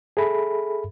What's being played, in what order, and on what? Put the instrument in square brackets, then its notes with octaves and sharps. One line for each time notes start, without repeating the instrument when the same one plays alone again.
[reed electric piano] G#4 A4 E5 B5